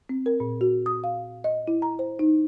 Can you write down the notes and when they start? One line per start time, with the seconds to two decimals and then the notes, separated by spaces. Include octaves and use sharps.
0.09 C4
0.26 A#4
0.40 A#2
0.61 F#4
0.86 D#6
1.04 F5
1.44 D#5
1.68 E4
1.82 A#5
1.99 C5
2.19 D#4